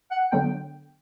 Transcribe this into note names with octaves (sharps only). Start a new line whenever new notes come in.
F#5
D3 F#3 B3 D4 G5